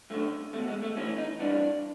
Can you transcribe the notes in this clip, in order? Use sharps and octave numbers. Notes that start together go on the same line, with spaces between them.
F#2 D3 A3
E2 B2 A3
G#3
A3
A2 E3 C#4
D#4
G2 E3 D4